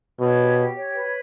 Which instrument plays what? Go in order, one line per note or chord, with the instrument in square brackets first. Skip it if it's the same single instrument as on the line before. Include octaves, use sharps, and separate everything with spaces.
[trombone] B2 [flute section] C#5
[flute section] G4
G4
C#5
B4